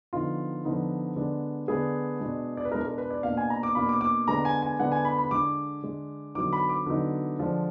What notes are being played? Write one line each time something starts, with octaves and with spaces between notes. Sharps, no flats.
D3 F3 B3 D#4 F4
D3 F3 B3 D#4
D3 G#3 B3 D4
D3 G#3 B3 D4 G#4
B2 G#3 D4
D5
B4
B2 G#3 D4 A#4
A#4
B4
D5
B2 A#3 D4 F5
G#5
A#5
D6
B2 A#3 D4 B5
D6
D6
D3 G#3 B3 D4 A#5
G#5
G#5
D3 G#3 B3 D4 F#5
G#5
B5
B5
D3 G#3 D4 D6
D3 G#3 D4
D3 F#3 B3 D#4 D6
B5
D6
D3 F#3 B3 D#4
D3 F3 G#3 D4